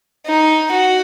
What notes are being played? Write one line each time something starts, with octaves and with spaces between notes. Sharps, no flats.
D#4
F#4